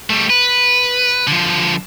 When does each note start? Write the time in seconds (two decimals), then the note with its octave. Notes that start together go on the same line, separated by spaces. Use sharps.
0.10 G3 A3
0.30 B4
1.27 D3 F3